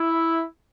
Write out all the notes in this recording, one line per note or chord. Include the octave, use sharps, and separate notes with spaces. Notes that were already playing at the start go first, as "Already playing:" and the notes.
Already playing: E4